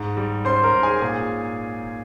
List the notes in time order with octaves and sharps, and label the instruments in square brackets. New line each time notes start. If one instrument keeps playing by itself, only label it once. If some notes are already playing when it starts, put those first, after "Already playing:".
Already playing: [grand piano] G#2
G3
C#4 C5 C6
A#4 A#5
G#2
G#4 G#5
A#2 G#4 G#5